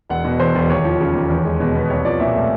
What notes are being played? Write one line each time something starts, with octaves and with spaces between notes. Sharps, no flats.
E1 F#5
B2
E2 C5
E1
D#2 C#5
F3
C#3
D#2
E2
G#3
B2
B3
C2 C#5
F3 D5
A#2 E5
A3